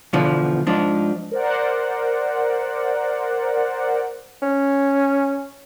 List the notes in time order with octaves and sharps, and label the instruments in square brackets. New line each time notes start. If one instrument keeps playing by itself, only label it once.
[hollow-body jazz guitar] E2 B2 D3 F3
G#2 F3 D4
[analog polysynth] A#4 C5 D5 F#5
[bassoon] C#4